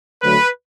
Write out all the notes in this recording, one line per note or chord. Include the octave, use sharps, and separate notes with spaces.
D2 D3 F#3 A3 B4